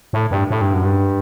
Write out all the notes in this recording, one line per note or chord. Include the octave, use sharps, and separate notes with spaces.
A2
G2
A2
G2
F#2
G2